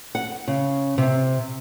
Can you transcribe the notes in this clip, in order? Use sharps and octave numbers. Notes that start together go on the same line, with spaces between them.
F#5
C#3
C3